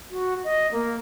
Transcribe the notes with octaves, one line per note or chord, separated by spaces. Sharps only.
F#4
D#5
A#3